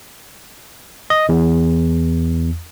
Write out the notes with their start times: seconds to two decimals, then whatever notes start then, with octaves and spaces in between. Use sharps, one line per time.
1.10 D#5
1.29 E2